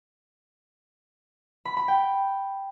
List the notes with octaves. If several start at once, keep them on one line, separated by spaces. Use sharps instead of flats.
B5
B5
G5